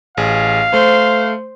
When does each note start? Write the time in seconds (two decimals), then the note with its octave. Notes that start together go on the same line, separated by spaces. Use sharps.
0.17 A1 G#4 F5
0.74 A3 C5